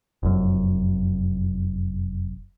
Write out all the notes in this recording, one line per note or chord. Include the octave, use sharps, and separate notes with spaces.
F1 F#2